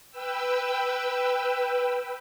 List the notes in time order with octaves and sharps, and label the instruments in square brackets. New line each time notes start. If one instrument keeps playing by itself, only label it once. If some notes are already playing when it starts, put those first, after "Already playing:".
[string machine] B4 G5 E6